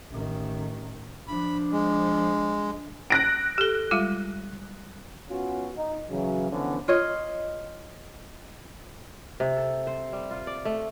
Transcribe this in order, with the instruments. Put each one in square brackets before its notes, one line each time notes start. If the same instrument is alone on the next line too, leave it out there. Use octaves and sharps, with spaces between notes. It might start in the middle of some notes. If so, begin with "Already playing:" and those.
[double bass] A1 D#3
[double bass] F3 D4 [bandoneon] B5
[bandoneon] G#3
[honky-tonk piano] F#6 A#6 D7
[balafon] G4 A4
G3 G#3 F4
[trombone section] B3 C#4 F4 F#4
D#4
C#3 E3 F#3
D3 E3 F3 B3 C#4 E4
[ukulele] F4 C#5 D#5
[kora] C3
A4
C5
G3
F4
D5
A3